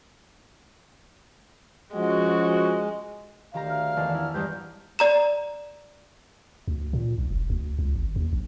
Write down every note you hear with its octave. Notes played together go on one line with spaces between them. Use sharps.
F3 G#3 C#4 F#4
D2 D#3 G4 F5 A#5
F6
E2 D#3 A5
E4
E2 G2 D#4 G6
D5 A#5 E7
D2
A#2
B1
E1
D2
C#2
G#1
D#2
A#1